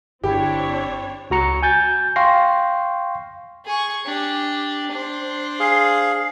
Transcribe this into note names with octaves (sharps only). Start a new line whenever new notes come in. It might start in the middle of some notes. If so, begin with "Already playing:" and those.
G1 D3 C4 D4 E4 G4 C#5
C#2 F#4 A#5 C#7
G#5 G6 A6
F5 G5 C6 C#6 A#6 C7
G#4 C#6
D4 G4
D4 C5
G#4 F5